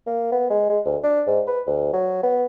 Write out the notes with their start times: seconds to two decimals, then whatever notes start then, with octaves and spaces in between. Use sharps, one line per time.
0.07 A#3
0.32 B3
0.50 G#3
0.69 G#3
0.85 D2
1.03 D4
1.27 G#2
1.47 B4
1.67 D2
1.93 F#3
2.23 B3